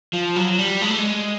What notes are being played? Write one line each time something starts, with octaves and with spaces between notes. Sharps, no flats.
F3
F#3
G3
G#3
A3
G#3